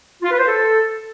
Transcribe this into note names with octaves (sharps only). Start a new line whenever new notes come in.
F4
B4
C5
A4